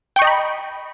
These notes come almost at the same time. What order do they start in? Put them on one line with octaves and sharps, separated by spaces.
G5 C#6 D#5 A#5 B5